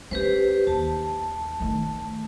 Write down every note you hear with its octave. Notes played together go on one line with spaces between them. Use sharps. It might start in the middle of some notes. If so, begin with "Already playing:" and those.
C#4 G4 B4 C5
D#2 A5
D#3 A3